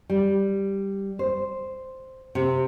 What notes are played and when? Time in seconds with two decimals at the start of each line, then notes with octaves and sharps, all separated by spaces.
0.10 G3
1.19 C5
2.35 C3